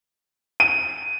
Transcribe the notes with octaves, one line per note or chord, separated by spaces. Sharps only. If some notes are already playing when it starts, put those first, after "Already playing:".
D#7